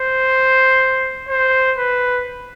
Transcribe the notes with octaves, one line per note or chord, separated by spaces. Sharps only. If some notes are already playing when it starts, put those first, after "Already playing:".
Already playing: C5
C5
B4